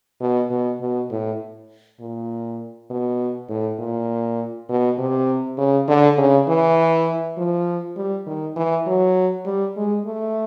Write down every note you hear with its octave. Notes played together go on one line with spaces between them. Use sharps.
B2
B2
B2
A2
A#2
B2
A2
A#2
B2
C3
C#3
D3
C#3
E3
F3
G3
D#3
E3
F#3
G3
G#3
A3